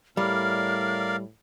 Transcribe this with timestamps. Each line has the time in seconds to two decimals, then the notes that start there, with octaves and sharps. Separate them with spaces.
0.17 A2 G3 A#4 D5 F5 F6